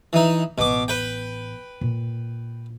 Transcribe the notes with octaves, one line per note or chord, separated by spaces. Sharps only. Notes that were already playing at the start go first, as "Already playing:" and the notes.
E3 D#4
A1 B2 B3 D6
B4 G5
A#2